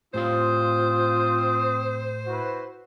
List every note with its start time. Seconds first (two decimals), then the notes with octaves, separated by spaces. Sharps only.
0.14 A2 C4 F4 G4 C5 F5 D#6
2.27 E4 F#4 B4